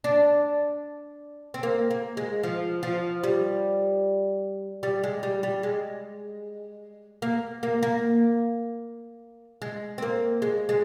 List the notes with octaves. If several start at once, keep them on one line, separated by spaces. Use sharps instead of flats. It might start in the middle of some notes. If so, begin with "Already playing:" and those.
D4
C4
A#3
A#3
G#3
F3
F3
G3
G3
G#3
G3
G3
G#3
A#3
A#3
A#3
G#3
C4
A#3
G#3
G#3